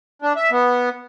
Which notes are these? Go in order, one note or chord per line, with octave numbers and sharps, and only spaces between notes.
D4
E5
B3